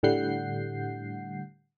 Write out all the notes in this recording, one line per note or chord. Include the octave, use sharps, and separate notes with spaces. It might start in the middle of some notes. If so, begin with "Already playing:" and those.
A2 D3 G3 F#5 G6 C7